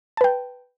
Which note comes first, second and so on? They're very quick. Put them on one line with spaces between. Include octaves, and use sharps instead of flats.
A5 B4 G5